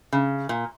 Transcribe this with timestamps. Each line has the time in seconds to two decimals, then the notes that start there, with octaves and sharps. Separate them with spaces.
0.13 C#3
0.49 A#2